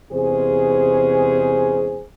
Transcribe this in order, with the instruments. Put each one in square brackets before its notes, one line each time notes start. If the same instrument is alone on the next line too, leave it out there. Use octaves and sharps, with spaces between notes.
[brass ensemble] E2 C3 G#3 C#4 G#4 C5